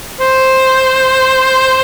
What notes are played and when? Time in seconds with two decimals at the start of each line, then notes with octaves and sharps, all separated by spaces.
0.20 C5